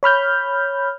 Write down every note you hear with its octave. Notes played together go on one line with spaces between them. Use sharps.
C#5 B5 F6 G6